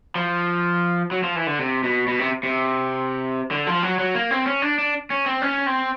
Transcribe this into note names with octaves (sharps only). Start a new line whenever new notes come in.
F3
F#3
F3
E3
D3
C3
B2
B2
C3
C3
D3
F3
F#3
F#3
A#3
C4
C#4
D4
D4
C#4
C4
C#4
C4